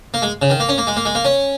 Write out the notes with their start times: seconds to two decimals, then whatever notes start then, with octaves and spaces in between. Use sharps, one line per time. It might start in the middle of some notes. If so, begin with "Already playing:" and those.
0.14 A#3
0.22 G#3
0.42 C#3
0.50 D#3
0.60 A#3
0.69 C#4
0.78 A#3
0.87 G#3
0.97 A#3
1.05 G#3
1.15 A#3
1.25 C#4